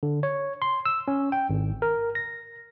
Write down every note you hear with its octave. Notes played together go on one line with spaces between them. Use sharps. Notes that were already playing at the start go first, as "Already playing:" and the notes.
D3
C#5
C6
E6
C#4
G5
G#1
A#4
A#6